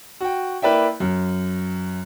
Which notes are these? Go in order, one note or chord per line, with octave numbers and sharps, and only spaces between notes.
F#4 G5
A#3 E4 B4 D5 E5 G5
F#2